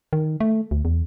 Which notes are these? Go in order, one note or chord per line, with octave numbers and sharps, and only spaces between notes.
D#3
A3
D2
E2